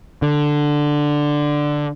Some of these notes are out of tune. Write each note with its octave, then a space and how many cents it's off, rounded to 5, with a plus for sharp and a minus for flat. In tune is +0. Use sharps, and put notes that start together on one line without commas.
D3 +5